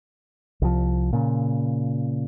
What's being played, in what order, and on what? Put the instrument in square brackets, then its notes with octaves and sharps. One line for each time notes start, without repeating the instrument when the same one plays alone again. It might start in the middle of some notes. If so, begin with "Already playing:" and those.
[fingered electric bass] C2 F3
A#2 C#3